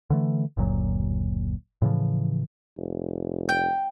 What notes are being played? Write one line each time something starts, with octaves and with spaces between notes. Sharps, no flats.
D3 E3 A3
F#1 D2 A#2 F#3
A2 C#3 E3 F3
F1
G5